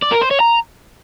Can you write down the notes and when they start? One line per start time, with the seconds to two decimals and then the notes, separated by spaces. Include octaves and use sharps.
0.02 D5
0.12 A#4
0.21 C5
0.31 C#5
0.40 A#5